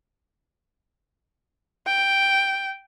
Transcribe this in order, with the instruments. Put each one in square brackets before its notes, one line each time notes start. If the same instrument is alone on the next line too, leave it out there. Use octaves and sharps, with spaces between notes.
[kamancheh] G5